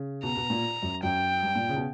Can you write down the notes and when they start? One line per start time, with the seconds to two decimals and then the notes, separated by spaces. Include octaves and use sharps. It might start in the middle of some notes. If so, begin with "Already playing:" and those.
Already playing: C#3
0.23 B2 A#5
0.37 B2
0.50 A#2
0.83 F#2
1.03 F#2 G5
1.43 G2
1.55 A#2
1.69 C#3
1.76 B2